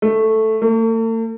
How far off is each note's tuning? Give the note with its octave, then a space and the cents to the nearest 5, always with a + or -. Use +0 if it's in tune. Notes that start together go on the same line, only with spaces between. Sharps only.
A3 +0
A3 +45